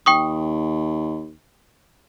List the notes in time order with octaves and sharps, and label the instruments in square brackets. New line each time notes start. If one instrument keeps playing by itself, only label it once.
[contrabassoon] D#2 [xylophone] G5 C#6 D#6